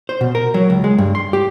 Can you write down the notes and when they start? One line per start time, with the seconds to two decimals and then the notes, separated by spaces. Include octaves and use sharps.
0.09 C5
0.21 B2
0.35 A#4
0.54 F#3
0.70 C#2
0.84 G#3
0.98 G2
1.15 C6
1.33 G4